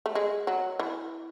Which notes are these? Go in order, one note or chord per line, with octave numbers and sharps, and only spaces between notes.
A3
G#3
F#3
E3